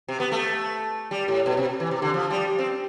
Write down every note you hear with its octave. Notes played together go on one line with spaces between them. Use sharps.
C3
B3
A3
G3
A2
B2
C3
E3
C3
D3
F3
G3
C4